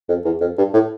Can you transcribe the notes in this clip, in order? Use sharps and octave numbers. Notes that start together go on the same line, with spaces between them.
F2
E2
F2
G2
A2